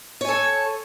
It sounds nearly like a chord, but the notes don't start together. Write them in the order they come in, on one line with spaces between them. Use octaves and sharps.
C#5 G#5 A4